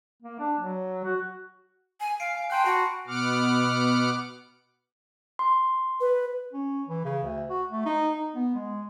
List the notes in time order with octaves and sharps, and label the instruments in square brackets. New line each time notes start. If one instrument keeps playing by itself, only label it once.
[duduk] A#3
D4
F#3
F#4
[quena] G#5
[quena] F5 [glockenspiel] C7 D7
[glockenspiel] G#5 D7
[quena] G5 [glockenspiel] A5 C6 F#6
[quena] F#4 [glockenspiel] B5 F#6 C7
[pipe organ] B2 B3 F#5 D6 F6
[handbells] C6
[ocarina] B4
[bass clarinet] C#4
E3
C#3
D2
F#4
A3
D#4
D#4
B3
G#3